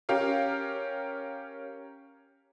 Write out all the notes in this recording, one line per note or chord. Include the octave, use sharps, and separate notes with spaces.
C#4 G4 A#4 F5